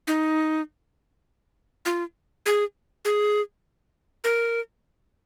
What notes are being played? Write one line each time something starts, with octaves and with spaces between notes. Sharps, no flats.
D#4
F4
G#4
G#4
A#4